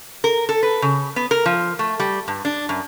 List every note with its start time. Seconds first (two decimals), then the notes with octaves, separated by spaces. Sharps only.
0.24 A#4
0.49 A4
0.63 B4
0.82 C#3
1.16 B3
1.31 A#4
1.46 F3
1.79 A3
2.00 G3
2.28 G2
2.45 D4
2.69 F#2